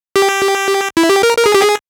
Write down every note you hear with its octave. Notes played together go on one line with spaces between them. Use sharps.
G4
E4
G4
A#4
A#4
G#4
G4
G#4